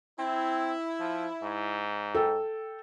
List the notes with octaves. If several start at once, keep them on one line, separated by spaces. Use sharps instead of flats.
C4 E4
F3
G#2
A4 G5